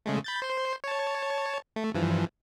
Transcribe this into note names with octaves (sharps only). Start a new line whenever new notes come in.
C#3 G#3 A3
B5 G6 A6
C5 C6
C#5 A5
A3
G2 E3 F3